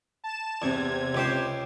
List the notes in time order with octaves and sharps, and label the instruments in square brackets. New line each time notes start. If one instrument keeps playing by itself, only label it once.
[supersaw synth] A5 E7
[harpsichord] E2 [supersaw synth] C3 G#6
[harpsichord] C#2 G4 C5